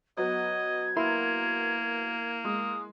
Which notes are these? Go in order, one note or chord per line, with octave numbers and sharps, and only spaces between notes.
F#3 B3 D#5 G#6
A#3 E4 A#4 C6
G#3 D#6